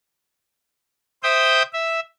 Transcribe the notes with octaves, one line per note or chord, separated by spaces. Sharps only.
C5 E5 G5 D#6 G6
E5